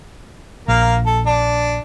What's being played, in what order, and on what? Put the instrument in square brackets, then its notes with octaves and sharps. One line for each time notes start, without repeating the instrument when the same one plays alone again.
[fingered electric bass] A#1 [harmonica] A#3 F5
[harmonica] A4
D4